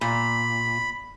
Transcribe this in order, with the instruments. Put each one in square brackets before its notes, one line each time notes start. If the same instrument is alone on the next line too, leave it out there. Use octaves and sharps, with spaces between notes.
[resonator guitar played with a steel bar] A#2 [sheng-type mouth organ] B5